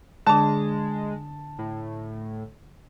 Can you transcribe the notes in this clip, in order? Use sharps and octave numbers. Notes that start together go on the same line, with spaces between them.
D3 G#3 D4 A5
A2